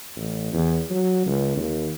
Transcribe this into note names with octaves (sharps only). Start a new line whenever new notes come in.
A1
E2
F#3
C#2
D#2